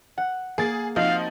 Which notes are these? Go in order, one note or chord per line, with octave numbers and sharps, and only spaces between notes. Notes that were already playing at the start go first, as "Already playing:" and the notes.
F#5
A#3 G#4 A6 C7
F3 C4 D#4 F#4 F5